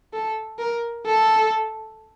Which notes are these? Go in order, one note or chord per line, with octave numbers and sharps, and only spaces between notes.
A4
A#4
A4